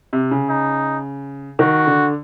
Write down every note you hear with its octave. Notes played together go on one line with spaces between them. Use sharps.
C3
C#3
D#4
D#3 F#4
D3